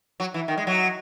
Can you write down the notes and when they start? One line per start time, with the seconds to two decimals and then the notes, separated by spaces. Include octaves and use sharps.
0.20 F#3
0.34 E3
0.48 D#3
0.57 G#3
0.67 F#3